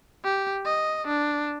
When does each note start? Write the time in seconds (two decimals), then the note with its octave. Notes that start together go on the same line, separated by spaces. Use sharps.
0.24 G4
0.65 D#5
1.07 D4